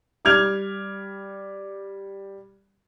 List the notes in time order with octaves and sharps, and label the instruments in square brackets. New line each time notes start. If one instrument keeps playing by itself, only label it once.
[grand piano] G3 D6 F6 G#6 F7